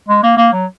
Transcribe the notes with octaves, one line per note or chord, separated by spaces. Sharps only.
G#3
A#3
A#3
F#3